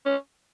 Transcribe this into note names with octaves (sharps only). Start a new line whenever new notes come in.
C#4